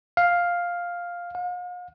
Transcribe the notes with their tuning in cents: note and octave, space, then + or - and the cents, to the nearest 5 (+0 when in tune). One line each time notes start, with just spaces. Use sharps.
F5 +5
F5 +45